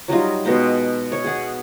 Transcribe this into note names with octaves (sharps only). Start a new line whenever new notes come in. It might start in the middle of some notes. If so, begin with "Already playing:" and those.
F#3 G3 D#4 F4
B2 G#3 D#4 G5
C#5
G#4 F#5